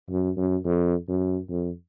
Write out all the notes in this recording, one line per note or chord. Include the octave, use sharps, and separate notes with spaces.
F#2
F#2
F2
F#2
F2